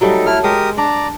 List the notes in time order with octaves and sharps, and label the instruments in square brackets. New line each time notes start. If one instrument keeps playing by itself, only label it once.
[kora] F#3 G3 A3 [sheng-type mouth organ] D#4 A4
[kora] A3 [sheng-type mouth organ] E4 F6
[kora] G#3 [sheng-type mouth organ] G4 A#4 D#6
[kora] D4 [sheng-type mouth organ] D5 A#5